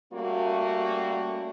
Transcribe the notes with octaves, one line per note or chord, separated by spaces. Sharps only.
G3 A3 A#3 C#4 F#4